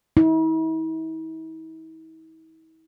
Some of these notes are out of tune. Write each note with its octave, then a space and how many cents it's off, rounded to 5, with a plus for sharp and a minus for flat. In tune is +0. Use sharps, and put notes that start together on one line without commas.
E4 -45